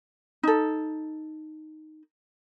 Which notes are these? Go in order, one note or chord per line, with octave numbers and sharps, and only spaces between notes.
D#4 A4